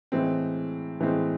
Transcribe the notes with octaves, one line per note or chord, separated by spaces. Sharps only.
A2 E3 G#3 C4
A2 E3 G#3 C4